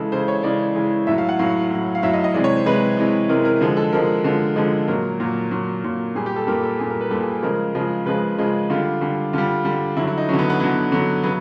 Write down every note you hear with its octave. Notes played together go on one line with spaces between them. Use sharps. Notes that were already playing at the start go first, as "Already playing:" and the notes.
Already playing: C#3 E3 G#3 A4
C#3 E3 G#3 C5
C#5
C#3 E3 G#3 D5
C#3 E3 G#3
A2 F#3 E5
F5
F#5
A2 F#3 F5
A2 F#3
F5
A2 F#3 E5
D#5
D#5
C3 E3 G#3 D5
C#5
C5
C3 E3 G#3 B4
C3 E3 G#3
C3 E3 G#3 A#4
A#4
D3 F3 G#3
A4
D3 F3 G#3 A#4
D3 F3 G#3
D3 F3 G#3
A#2 F#3 A#4
A#2 F#3
A#2 F#3
A#2 F#3
A#2 G3 G#4
G4
A4
A#2 G3 A#4
A4
A#2 G3 G#4
A#4
B4
A#2 G3 A4
G#4
G#4
C#3 F3 G#3 A#4
C#3 F3 G#3
C#3 F3 G#3 B4
C#3 F3 G#3
D3 G3 F4
D3 G3
D3 G3 F4
D3 G3
D3 F#3 E4
E4
D#4
D3 F#3 C#4
B3
B3
D3 F#3 B3
D3 F#3
C#3 F#3 B3